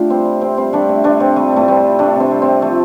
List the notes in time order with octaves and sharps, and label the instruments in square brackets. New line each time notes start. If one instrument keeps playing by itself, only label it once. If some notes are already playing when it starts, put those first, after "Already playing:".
Already playing: [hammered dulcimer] C3 A3 D4 F4 G4
G3 C4
G3
C3 C4
G3 C4
G3 A3 D4
C3
C3 A3 D4
C3 C4
G3 A3
A2 A3
G3 C4
G3
C3 A3 D4
C3 C4
G3
C4
C3
F3 A3